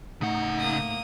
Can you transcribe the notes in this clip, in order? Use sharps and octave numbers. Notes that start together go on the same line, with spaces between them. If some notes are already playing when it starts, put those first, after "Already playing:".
A2 C#3 D#4 F#5
A#3 D#6